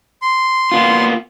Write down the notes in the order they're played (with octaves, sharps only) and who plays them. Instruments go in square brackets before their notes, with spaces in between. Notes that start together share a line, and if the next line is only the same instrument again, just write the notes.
[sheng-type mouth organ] C6
[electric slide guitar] A#3 B3 F4